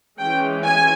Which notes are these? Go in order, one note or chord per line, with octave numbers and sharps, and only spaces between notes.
E3 G#3 C#4 G5
G#5